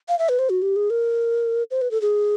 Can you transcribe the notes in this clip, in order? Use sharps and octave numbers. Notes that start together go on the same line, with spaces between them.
F5
E5
B4
C5
F#4
G4
G#4
A#4
C5
B4
A4
G#4